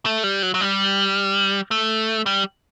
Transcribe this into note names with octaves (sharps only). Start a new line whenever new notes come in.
A3
G3
F#3
F#3
G3
A3
G3